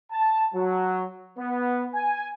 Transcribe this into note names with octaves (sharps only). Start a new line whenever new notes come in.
A5
F#3
B3
G#5